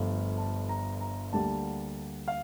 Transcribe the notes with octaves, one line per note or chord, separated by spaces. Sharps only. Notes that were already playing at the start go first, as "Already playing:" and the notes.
Already playing: G1 G2 F3 A3
A5
A#5
A#5
D2 D3 G3 A#3 A5
F5